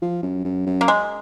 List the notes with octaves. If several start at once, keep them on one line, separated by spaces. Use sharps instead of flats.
F3
F#2
F#2
F#2
A#3
G#3